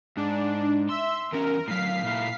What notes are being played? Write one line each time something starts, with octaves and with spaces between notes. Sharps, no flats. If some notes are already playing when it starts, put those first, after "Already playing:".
G#2 D4
E5 C6 E6
E2 C#4 A#4
A2 F#3 F5 B6 C7
A#2 E4